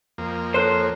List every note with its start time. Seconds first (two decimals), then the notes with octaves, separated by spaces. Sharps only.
0.18 F2 A#3
0.54 A4 C5 C#5 F#6